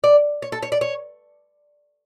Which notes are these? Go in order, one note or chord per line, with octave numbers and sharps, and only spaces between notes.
D5
C#5
A4
C#5
D5
C#5